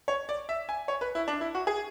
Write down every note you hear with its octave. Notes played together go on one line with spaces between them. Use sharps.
C#5
D5
E5
G#5
C#5
B4
E4
D4
E4
F#4
G#4